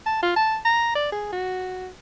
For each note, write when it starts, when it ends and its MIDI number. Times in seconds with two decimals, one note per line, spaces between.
0.06 0.19 81
0.22 0.35 65
0.36 0.58 81
0.65 0.92 82
0.95 1.10 74
1.12 1.28 68
1.33 1.88 66